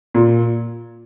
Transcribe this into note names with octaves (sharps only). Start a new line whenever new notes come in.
A#2